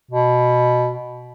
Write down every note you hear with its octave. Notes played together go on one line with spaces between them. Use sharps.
B2